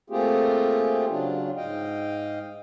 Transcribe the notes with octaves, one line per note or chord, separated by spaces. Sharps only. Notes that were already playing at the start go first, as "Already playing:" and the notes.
A3 A#3 C4 F4 G4 G#4
C#3 F#3 D4 F4
G#2 D#5 F5 G5